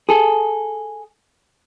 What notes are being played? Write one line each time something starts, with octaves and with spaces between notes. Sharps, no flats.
G#4 A4